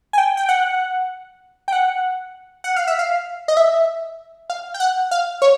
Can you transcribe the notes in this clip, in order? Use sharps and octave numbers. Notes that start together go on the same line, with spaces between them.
G#5
G5
G5
F#5
G5
F#5
F#5
F5
E5
F5
D#5
E5
F5
G5
F#5
F5
C#5